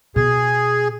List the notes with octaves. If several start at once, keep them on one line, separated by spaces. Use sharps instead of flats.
B2 G#4